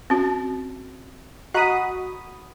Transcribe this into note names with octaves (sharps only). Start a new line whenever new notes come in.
C4 C#4 F#4
F#4 D#5 A#5 B5 D#6